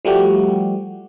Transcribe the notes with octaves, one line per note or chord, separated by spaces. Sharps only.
F3 G3 A3 F#4 G4